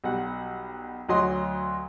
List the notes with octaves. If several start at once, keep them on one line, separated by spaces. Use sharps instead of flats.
B1 G3 F#5
D2 F#3 D#5 C6